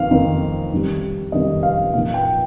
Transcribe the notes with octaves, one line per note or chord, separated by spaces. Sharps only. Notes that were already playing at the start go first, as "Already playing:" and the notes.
Already playing: F2 D#3 F5
F2 D#3 C4 D#4
F2 D#3 G3
F2 D#3 G3 D#5
F5
A#2 F3 A#3 D#4 F5
G5